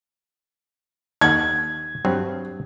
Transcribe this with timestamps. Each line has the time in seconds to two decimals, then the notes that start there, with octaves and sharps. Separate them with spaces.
1.21 D#2 F#5 G#6
2.05 G2 F#3 C4